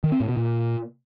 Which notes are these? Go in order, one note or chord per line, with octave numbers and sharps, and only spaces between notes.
D#3
C4
A2
B2
A#2